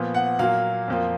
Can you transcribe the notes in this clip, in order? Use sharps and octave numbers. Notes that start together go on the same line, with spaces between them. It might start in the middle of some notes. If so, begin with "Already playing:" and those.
Already playing: A#2 F3 B3
F#5
A#2 F#3 A#3 F5
F2 F3 A#3